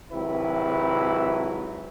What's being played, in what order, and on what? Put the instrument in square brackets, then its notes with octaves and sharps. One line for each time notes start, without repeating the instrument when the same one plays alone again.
[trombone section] G#1 C3 F#3 E4 B4